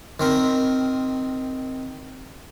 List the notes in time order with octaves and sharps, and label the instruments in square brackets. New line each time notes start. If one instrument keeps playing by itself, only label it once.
[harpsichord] D#3 C4 A#4